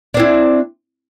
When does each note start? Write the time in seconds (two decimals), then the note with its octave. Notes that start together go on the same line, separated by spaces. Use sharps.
0.14 D4
0.17 C4
0.20 E4